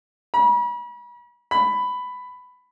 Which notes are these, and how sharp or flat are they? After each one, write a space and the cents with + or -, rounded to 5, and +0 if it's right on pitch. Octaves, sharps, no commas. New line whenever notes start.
B5 -40
B5 +10